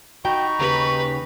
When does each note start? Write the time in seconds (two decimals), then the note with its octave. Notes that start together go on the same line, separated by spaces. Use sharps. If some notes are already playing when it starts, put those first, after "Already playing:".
0.25 D#4 F#4 G5 A#5 B5 C#6
0.59 D#2 C#3 G4 B4